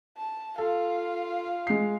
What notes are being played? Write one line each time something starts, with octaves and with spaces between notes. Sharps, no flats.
A5
F4 A4 F5
G#3 C7